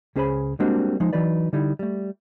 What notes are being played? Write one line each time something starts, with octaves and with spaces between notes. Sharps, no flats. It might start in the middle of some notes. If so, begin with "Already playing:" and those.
C#2 C#4 G#4 C5 G#5 B5
G3 G#3 A#3 C4 D4 F#4
F3 G#3 D#4 C6
E3 F#3 D#4 B4 D5
D3 G3 D#4 E4
G3 A3